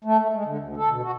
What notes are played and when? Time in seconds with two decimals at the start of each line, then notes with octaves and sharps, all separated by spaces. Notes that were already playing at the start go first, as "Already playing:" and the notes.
0.04 A3
0.19 A3
0.33 G#3
0.45 D3
0.58 D2
0.77 A4
0.90 B2
1.03 F#4